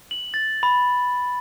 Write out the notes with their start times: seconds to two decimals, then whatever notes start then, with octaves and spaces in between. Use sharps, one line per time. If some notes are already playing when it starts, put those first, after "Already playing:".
0.11 F#7
0.34 A6
0.63 B5